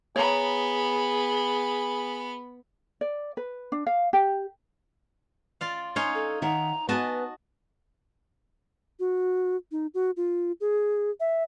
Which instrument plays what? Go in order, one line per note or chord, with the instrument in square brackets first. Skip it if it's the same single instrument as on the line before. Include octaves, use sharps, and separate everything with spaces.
[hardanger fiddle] B3 B5 [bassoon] G#4 [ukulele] C#5 A#5
[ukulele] D5
B4
D4
F5
G4
[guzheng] F4 D5 F5
[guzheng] D#4 C#5 F5 [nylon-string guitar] G#5 [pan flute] C6
[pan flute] A4
[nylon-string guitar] D#3 E5 F#5 [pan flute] A#5
[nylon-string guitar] B3 G#5 [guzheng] F#4 D#5 A5 [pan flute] B4
[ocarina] F#4
D#4
F#4
F4
G#4
E5